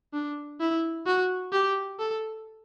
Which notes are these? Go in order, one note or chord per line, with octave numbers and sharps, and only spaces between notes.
D4
E4
F#4
G4
A4